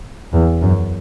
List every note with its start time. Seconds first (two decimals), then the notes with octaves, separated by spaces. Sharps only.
0.33 E2
0.61 F#2